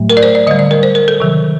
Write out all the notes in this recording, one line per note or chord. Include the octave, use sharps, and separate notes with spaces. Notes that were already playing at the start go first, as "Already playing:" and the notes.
Already playing: A2 F#3 A3
A#4
D5
C5
D5
D3 G3 D#5
D5
A#4
C5
A#4
A4
C3 D#3 F#3